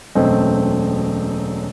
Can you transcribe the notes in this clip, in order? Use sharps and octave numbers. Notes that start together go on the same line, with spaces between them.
E1 F#2 A3 C4 D#5